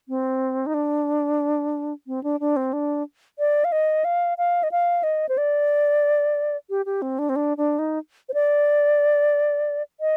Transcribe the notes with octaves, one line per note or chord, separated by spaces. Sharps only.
C4
D#4
D4
C4
D4
D4
C4
D4
D5
F5
D#5
F5
F5
D#5
F5
D#5
C5
D5
G4
G4
C4
D4
C4
D4
D4
D#4
C5
D5
D#5